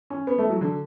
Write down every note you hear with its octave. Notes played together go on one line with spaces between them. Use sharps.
C#4
B3
A3
F#3
D3